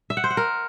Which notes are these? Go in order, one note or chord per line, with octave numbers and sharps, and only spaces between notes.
E5
F#5
C5
F#5
A#4